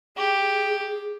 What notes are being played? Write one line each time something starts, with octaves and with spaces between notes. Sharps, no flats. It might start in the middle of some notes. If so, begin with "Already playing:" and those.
G4 G#4